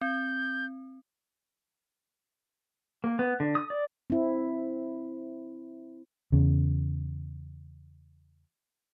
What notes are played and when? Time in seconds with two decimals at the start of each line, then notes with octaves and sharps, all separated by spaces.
0.01 C4 G6
3.04 A#3
3.19 B3
3.40 D3
3.55 D#6
3.70 D5
4.10 C4 E4
6.32 E2 C#3